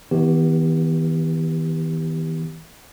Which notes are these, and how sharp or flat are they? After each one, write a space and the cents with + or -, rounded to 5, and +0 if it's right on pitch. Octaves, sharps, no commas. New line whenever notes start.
E3 -45 B3 +0 G4 +0